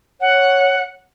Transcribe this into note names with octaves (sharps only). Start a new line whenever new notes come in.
C#5 F#5